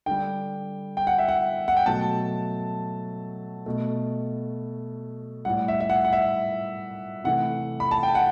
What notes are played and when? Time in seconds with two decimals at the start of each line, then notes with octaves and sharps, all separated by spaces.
0.06 D3 G3 G5
0.97 G5
1.07 F#5
1.18 E5
1.28 F#5
1.68 F#5
1.77 G5
1.86 B2 F#3 A3 A5
3.66 B2 A3
5.45 A2 G3 F#5
5.68 E5
5.80 E5
5.90 F#5
6.05 F#5
6.13 E5
7.24 C3 E3 A3 F#5
7.80 B5
7.91 A5
8.03 G5
8.15 F#5